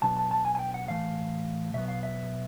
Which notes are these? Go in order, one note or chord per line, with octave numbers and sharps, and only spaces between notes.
B2 F#3 B3 D4 A5
A5
A5
G#5
G#5
G5
F#5
A2 E3 A3 F5
B2 F#3 B3 E5
F5
E5